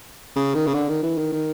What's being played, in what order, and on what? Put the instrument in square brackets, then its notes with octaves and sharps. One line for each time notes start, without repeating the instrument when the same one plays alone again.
[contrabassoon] C#3
D#3
C#3
D3
D#3
E3
D#3
D#3